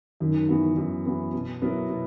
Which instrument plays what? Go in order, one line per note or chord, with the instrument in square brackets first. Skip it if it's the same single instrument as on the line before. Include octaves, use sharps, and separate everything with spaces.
[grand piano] F#2 [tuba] D#3
[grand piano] E3 B3 F#4
F#2
E3 B3 F#4
B2
F#3 B3 E4 A#4
B2